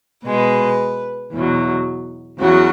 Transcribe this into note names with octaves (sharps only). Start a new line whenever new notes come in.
B2 G#3 B4
E2 B2 F#3
E2 C#3 F#3 F#4